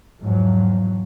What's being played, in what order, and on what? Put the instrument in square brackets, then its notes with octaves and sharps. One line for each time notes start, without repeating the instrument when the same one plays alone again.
[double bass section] E2 G#2 F3 F#3